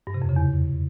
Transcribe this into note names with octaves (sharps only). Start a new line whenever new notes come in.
G2
C3
F2
C#3
E2